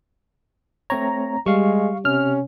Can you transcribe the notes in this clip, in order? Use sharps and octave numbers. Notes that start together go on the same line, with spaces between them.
A3 C4 C#5 A#5
G3 G#3 F5 C#6
C3 C#4 F6